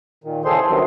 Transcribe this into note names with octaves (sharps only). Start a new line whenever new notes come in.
A#2 D#3
E2 C#3 G#4 A4 C5 C6
G2 C3 D#3 F#3